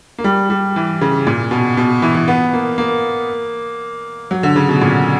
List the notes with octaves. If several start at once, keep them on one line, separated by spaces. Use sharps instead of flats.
A#3
G3
G3
E3
C#3
A#2
B2
B2
E3
E3
B3
A#3
A#3
F#3
D3
C#3
B2
A#2